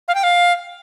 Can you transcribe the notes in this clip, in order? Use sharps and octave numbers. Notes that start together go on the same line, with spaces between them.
F5
G5
F5